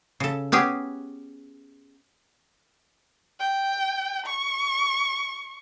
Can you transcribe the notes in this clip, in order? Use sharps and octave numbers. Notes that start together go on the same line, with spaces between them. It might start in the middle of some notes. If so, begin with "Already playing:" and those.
C#3 A4
B3 C#4 G4 G#4
G5
C#6